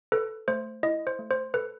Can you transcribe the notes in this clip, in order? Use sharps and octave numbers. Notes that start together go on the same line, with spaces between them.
A4 B4
A3 C5
E4 D#5
C5
A3
C5
A4 B4